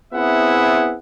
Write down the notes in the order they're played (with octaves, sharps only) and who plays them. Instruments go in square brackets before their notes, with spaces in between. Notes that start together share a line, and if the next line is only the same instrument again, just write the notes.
[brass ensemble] B3 C4 E4 G#4 E5 F#5